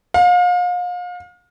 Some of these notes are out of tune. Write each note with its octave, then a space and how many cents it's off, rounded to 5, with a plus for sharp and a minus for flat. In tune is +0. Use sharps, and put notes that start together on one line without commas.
F5 +35